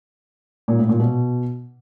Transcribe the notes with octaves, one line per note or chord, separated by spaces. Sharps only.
A#2
A2
A#2
B2